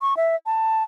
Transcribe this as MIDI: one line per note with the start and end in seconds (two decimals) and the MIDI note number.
0.02 0.17 85
0.17 0.36 76
0.46 0.83 81